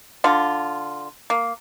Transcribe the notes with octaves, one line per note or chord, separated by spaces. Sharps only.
D3 F4
A#3